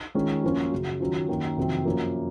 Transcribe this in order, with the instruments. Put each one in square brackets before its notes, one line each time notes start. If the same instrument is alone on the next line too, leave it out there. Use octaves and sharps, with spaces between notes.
[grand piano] D#3 G#3 C#4 F4
F#2 F3 A#3 C#4 F4
F#2 C#3 F#3
D#3 F#3 C#4 F4
F#2 D#3 A#3
F2 C3 D#3 F#3 C4
F#2 F3 A#3